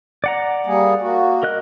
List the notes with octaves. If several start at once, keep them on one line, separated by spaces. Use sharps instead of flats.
D5 F#5 A#5
G3 A#3 G#4
A#3 F#4
A#4 D#5 F#6